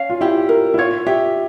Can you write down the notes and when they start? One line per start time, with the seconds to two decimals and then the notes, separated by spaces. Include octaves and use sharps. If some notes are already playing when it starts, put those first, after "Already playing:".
Already playing: C#4 F5
0.10 F4
0.21 E4 G4
0.49 A#4
0.74 E4
0.78 F4 C#5
1.07 G4 E5